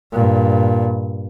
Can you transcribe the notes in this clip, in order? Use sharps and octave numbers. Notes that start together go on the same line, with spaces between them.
G2 A#2